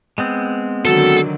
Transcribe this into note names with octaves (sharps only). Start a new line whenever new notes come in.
G#3 B3 C4
D3 D#3 F#3 F#4 A4